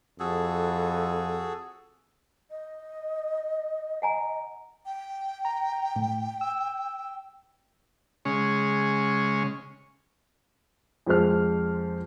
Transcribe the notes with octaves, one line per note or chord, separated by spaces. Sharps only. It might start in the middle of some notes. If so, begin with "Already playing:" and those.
F2 F#4 G#4 A4
D#5
F#5 G#5 A#5
G5
A#5
A2
E6
C#3 G#3 C#4
F2 F3 G#3 C5 F6